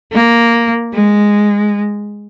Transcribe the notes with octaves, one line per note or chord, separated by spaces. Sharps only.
A#3
G#3